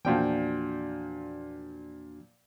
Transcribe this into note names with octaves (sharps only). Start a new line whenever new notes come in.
E2 A#2 F3 D4 F#4 G5